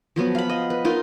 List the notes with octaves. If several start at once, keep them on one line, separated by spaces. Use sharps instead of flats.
F3 F#3 B3
F5 B5
D#5
B4
D#4 F4 A#4